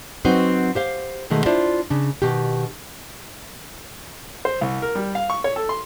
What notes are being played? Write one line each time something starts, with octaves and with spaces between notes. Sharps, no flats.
F#3 C4 D#4 F#4 B4 C5
G4 C5 F5
B2 D#3 G#3 A3
D4 E4 F4 C5 D5
C#3 D4
B2 D#3 G4
C5
C2
A#4
G3
F5
C#6
C#5
A4
C6